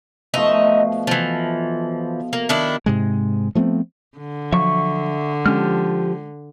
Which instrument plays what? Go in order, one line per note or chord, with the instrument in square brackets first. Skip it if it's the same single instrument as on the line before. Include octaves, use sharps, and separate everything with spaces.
[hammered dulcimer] B2 F3 A3 [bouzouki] D#4 D#5 E5
[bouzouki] E3 F3 [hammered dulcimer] F5
[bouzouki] A#3
D#3 D4 E4
[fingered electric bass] G#2 C3 G#3
F3 A3 B3 C4
[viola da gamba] D3
[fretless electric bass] F3 F#3 [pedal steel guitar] E5 C#6
[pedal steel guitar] F3 G4 F6 [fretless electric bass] G#3 C#4